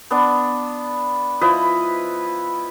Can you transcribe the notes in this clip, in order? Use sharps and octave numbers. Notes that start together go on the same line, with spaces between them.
B3 D4
F3 E4 B4 D#5